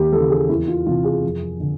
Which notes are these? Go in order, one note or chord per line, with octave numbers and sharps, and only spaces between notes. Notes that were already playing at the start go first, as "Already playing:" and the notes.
Already playing: D#2 G4
C#3 E3 A4
G#4
E2 E4
F4
C3 E3 F4
G#4
F2
D3